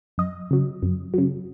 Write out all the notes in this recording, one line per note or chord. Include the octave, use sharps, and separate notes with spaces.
F#2 D#5
C#3 F#3
F#2
C#3 F#3